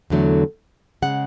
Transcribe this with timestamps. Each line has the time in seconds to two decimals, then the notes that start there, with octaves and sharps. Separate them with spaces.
0.10 E2 D3 F#3 A3
1.02 C#3 G#3 F#5